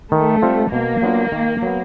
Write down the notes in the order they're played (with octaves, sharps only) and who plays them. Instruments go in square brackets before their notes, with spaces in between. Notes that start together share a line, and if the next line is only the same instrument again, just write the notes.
[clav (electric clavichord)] D#3 [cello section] A3
[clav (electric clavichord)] G3 C4 F4
[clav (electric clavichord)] B2 [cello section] A#3
[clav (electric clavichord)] F#3 B3 D4 F4
D#3
F#3 B3